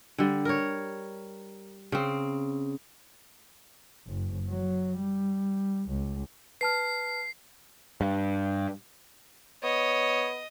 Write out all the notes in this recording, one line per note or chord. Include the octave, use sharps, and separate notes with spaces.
D3 G3
A#4 C#5
C#3 C4
F#1
F#3
G3
C#2
B4 A5 F6 C7
G2
B3 C#5 D#5